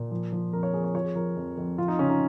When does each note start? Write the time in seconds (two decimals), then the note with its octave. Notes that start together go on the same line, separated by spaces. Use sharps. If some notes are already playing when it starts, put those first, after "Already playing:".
Already playing: A#2
0.11 F3
0.32 F3
0.53 F2 A#4
0.63 C#5
0.74 F2 G#4
0.84 C#5
0.94 F3 C#5
1.05 G#4
1.15 F3 A#4
1.36 F2
1.57 F2
1.78 F2 F4
1.88 D#4
1.99 C#3 C#4
2.09 D#4